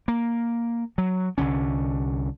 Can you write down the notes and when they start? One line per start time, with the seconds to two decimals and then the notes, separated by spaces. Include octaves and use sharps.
0.08 A#3
0.98 F#3
1.38 C2 D3 C#4